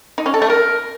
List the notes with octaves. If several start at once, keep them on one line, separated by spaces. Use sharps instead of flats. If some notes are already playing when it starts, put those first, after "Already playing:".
D#4
C#4
A4
A3
A#4